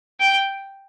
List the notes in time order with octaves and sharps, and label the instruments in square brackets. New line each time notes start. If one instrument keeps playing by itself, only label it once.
[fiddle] G5